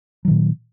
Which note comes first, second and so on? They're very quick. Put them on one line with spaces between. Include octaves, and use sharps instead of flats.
F#3 D#3 A#2